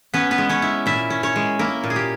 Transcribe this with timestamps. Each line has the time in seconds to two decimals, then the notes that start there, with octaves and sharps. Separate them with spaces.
0.14 B3 C#4 B4
0.31 B3 B4
0.38 G#3
0.49 C#4 C#5
0.62 E4
0.86 A#2 E4 E5
1.10 C#4
1.23 C#4 C#5
1.36 G#3
1.59 A#3 E4 A#4
1.84 A#2
1.90 G#4
1.96 G4